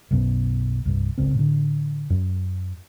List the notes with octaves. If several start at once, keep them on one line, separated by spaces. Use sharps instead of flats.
B1 F#2 B2
C2 G2
G#1 C#2 C4
A2 D3
F#2